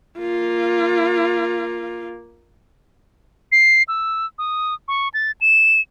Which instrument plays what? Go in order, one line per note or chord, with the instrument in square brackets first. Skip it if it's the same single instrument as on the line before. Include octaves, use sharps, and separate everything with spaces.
[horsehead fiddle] A#3 F4
[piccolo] C7
E6
D#6
C#6
A6
E7